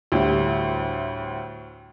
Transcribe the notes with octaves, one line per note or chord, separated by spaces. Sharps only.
D2 A2 G3